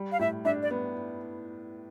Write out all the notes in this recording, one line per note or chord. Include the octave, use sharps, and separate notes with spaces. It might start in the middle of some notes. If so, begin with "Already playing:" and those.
Already playing: G3
F5
A2 E5
D4 E5
D5
B3